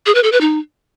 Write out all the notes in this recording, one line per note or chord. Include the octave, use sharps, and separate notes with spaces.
G#4
B4
A4
B4
D#4